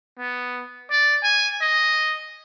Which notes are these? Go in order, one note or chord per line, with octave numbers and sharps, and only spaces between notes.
B3
D5
G#5
D#5